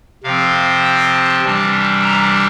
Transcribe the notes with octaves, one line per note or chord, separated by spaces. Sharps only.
C3 F3 C4 F5
G5
A5
C3 E3 G3 D4
A#5